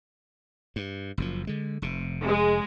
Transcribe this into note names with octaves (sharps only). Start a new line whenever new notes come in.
G2
F#1 F#2 F3
D3 G#3
F1 C3
G#3